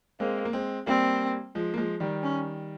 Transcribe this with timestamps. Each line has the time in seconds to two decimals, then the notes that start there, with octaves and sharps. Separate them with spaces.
0.20 G#3 A#3 C4
0.45 A#3
0.53 G#3 C4
0.87 G3 A#3 C4
1.55 F3 G#3
1.74 A#3
1.77 F3 G#3
2.00 D#3 G3
2.23 C#4